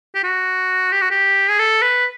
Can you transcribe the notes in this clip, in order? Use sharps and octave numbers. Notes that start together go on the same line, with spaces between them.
G4
F#4
G4
F#4
G4
G#4
A4
B4